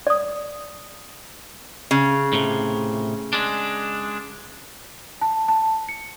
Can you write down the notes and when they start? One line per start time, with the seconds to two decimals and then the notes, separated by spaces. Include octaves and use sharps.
0.07 D5 D#6
1.91 C#3
2.33 A2 C3
3.33 G#3 D4
5.21 A5
5.48 A5
5.89 C#7